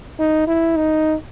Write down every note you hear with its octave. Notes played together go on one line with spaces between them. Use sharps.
D#4
E4
D#4